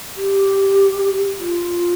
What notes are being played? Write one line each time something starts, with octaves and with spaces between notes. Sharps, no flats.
G4
F4